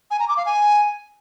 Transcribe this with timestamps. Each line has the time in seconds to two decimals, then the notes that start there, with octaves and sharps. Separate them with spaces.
0.11 G#5
0.19 A#5
0.28 D6
0.37 F5
0.46 G#5